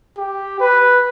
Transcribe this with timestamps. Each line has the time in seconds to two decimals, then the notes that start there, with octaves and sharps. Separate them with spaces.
0.18 G4
0.60 B4